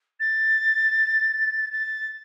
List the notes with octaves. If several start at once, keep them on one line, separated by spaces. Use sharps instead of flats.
A6
A6